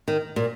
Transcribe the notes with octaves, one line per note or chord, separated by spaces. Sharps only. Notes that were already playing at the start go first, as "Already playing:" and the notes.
D#3
A#2